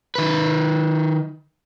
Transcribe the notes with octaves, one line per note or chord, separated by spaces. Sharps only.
D#3 B4